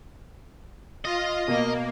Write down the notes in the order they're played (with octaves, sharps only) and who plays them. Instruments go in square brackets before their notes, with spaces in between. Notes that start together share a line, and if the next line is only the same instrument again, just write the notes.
[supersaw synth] F4 [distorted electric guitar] D#5
[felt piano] B2 [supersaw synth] A#3